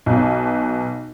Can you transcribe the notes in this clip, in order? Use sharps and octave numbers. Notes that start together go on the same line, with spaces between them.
B1 B2